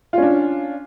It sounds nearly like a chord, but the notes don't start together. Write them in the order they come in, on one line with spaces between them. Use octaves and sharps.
F4 C#4 D4